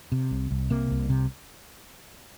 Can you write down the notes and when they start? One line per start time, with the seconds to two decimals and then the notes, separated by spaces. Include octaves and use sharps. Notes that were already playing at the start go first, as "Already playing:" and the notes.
0.12 C3
0.31 C2
0.51 C2
0.70 C3 A#3
0.90 C2
1.10 C3